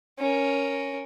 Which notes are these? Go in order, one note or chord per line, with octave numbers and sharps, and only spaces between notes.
C#4 A#4